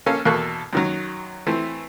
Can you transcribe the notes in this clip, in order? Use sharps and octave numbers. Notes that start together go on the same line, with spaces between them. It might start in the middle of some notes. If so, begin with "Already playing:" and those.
A#1 A#3 C#4 A4 F5
E2 B2 A#3 A4 C#6 F#6
F#2 D#3 F#3
E3 A3 C4